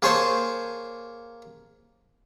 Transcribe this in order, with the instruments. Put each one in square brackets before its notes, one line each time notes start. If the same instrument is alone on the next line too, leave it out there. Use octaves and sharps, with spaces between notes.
[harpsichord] A#3 G#4 C5 C#5 A5